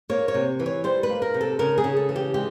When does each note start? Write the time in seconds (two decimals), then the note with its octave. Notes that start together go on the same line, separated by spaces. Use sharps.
0.09 A#3 C#5
0.28 C#5
0.34 C3
0.60 E3
0.66 C#5
0.84 G3 C5
1.03 B4
1.09 A#3
1.22 A#4
1.34 C3
1.41 A4
1.59 C#3 A#4
1.78 G#4
1.84 C#3
1.97 A4
2.09 E3
2.16 G4
2.34 G#3 G4